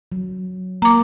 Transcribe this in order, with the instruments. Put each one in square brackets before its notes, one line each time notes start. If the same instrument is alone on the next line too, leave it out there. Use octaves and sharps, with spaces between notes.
[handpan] F#3
[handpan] A#3 [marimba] A#5 D6